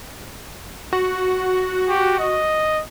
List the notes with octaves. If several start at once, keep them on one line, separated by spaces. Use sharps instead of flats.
F#4
G4
D#5